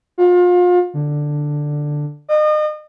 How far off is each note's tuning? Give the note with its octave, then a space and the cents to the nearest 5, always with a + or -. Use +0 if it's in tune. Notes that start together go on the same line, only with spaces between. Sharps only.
F4 +35
D3 +5
D#5 -35